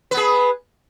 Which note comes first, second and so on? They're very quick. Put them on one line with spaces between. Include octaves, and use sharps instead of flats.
B4 B3 G#4